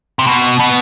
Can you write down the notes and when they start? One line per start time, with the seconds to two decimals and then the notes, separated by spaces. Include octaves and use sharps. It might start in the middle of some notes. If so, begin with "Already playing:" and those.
0.19 C3
0.26 B2
0.59 B2